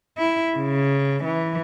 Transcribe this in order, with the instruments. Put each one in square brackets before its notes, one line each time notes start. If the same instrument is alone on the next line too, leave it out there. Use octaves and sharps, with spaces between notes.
[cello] E4
C#3
E3